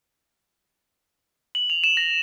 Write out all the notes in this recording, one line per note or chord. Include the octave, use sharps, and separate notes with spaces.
F#7
F7
E7
A#6